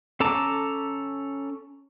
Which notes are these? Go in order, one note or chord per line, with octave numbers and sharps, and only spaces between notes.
C#4 A4 A5 A#5 D6